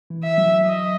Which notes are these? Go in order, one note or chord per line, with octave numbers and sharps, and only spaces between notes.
E3
E5
F#3
D#5